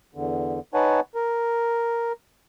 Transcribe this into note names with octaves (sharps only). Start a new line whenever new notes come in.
E2 D3
D#4 B4 C#5 F#5 G#5 A5
A#4